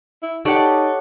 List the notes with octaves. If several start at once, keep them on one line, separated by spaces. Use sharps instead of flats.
E4
D#4 G4 A4 C#5 D5 F#5